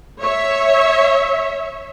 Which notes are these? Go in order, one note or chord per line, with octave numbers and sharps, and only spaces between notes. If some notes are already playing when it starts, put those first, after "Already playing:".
C#5 E5